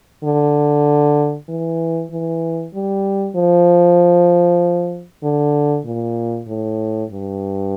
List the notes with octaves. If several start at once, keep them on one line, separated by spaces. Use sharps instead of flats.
D3
E3
E3
G3
F3
D3
A#2
A2
G2